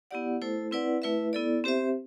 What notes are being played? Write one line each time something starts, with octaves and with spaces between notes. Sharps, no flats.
B3 E4 G4 D5 F#5
A3 E4 A4 C5
C4 E4 B4 D5 F#5
A3 E4 B4 E5
B3 E4 A4 D5
C4 G4 C5 E5